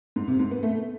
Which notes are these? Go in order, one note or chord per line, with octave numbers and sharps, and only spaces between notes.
G#2
C3
G#2
B3
A3